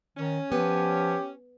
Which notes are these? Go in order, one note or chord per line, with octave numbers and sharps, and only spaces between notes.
D#3 C#4
F3 B3 G4